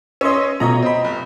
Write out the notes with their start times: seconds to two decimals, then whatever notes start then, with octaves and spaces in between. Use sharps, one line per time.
0.21 C#4 D#5 C6 C#6 E6
0.60 B2 A3 F4 C#5 D#5 A#5
0.82 C4 D#5 B5
1.04 F1